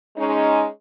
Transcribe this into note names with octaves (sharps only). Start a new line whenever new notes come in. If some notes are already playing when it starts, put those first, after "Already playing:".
G#3 C#4 D#4